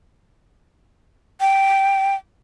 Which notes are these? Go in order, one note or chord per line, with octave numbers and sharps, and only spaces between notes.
G5